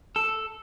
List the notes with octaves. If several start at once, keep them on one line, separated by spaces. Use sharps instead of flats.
A4